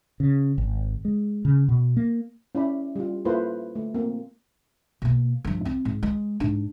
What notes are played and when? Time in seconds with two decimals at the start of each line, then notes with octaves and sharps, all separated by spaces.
0.20 C#3
0.58 G#1
1.05 G#3
1.45 C#3
1.69 B2
1.97 A#3
2.55 C#4 E4 D5 B5
2.96 G3 F4
3.25 A#3 E4 F4 A4 B4 C5
3.75 A3
3.94 A#3 C4
5.02 B2 A#3
5.45 G2 F3
5.65 C4 E4
5.85 G#2
6.03 G#3
6.40 G#2 D4